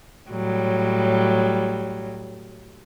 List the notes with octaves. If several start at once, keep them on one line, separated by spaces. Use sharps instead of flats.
A2 F#3 G3